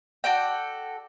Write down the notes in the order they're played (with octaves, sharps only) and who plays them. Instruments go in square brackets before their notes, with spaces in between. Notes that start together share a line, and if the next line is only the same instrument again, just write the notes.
[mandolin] F#4 A4 D5 G5